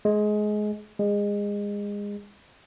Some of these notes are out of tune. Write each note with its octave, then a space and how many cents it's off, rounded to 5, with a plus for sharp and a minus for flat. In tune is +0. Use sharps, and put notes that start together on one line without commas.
G#3 +20
G#3 -25